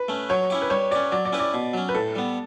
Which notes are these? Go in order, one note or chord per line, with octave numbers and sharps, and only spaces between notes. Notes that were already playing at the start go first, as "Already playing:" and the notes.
Already playing: B4
A3 C#4
F#3 C#5
C#4 E4 G4
B4
G3 C#5
C#4 G4 D5
F#3 D5
D5
C#4 E4 G4 B4
D5
B2
F#3 C#4
B4
A2 A4
G3 B3